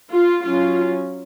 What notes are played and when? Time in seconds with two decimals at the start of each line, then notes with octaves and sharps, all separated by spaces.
0.09 F4
0.43 F#3 C#4 F4